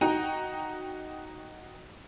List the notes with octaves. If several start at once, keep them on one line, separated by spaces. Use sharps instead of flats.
D#4 F#4 G5 A#5